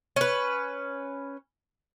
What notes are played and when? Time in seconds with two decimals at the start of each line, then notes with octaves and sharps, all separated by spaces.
0.16 C#4 B4